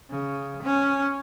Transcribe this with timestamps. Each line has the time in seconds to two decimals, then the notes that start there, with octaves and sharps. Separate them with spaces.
0.10 C#3
0.63 C#4